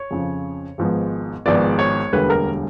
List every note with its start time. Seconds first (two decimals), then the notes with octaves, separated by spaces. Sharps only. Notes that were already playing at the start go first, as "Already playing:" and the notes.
Already playing: C#5
0.11 F2 C#3 F3
0.78 G#1 G#2 F3 G#3 B3
1.46 G#1 G#2 F3 G#3 B3 D5
1.79 C#5
2.12 E1 D2 D3 G3 A#3 B4
2.30 A#4